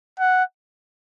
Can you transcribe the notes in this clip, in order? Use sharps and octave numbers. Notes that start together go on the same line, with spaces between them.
F#5